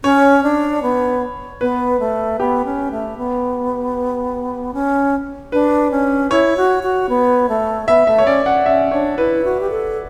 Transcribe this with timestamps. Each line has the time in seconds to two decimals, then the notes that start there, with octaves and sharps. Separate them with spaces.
0.03 C#4 C#5
0.43 D4
0.82 B3
1.61 B3 B4
1.99 A3
2.40 B3 G4
2.65 C#4
2.91 A3
3.18 B3
4.74 C#4
5.52 D4 B4
5.91 C#4
6.30 E4 C#5
6.57 F#4
6.83 F#4
7.09 B3
7.49 A3
7.88 B3 E5
8.06 A3 E5
8.18 C#5
8.26 C#4 D5
8.45 C#4 F#5
8.66 C#4 E5
8.91 D4 C#5
9.17 E4 B4
9.44 F#4
9.60 G4
9.70 A4